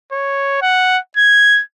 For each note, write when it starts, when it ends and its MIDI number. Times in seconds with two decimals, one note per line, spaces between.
0.12 0.60 73
0.62 0.98 78
1.17 1.61 92